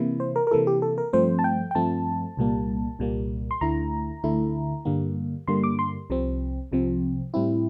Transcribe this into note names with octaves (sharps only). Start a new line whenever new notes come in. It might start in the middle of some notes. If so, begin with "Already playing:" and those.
Already playing: C3 E3 A#3 E4
C5
A#4
A#4
C3 E3 A#3 E4 A4
G4
A4
A#4
G2 F3 A3 C4 C5
A5
G5
G5
G2 F3 A3 C4 A5
C2 A#2 G3 A#3
C2 A#2 G3 A#3
C6
D2 D3 A3 E4 A#5
D2 D3 A3 E4
G2 D3 G3 A#3
G2 D3 G3 A#3 C6
D6
C6
C2 C3 F3 C4
C2 C3 F3 C4
A2 G3 C4 E4